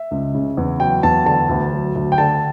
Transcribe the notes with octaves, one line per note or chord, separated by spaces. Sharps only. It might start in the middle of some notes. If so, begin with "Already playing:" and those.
Already playing: E5
C#2
C#3
E2
F#3 G5
E2 A5
D3 A5
D2
F#3
D2
G5
D3 A5